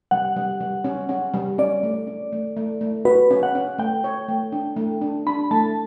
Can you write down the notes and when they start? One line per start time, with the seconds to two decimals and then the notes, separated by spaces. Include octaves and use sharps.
0.11 G3 F#5
0.36 G3
0.60 G3
0.84 C#4
1.09 C#4
1.34 G3
1.58 C#4 D5
1.83 A3
2.07 C#4
2.32 A3
2.57 A3
2.81 A3
3.05 F#4 B4
3.31 C#4
3.43 F#5
3.55 C#4
3.78 A3 G5
4.04 C#5
4.28 A3
4.52 D4
4.76 A3
5.02 D4
5.27 D4 B5
5.51 A3 A5